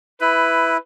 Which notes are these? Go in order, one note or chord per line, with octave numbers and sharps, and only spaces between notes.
E4 B4